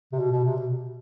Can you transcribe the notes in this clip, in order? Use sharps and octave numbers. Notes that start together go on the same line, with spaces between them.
C3
B2
B2
C3
B2